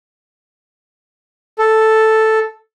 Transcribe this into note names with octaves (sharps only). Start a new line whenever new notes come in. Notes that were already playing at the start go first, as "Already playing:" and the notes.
A4